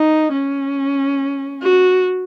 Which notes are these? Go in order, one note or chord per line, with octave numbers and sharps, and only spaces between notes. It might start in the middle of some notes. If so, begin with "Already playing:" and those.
Already playing: D#4
C#4
F#4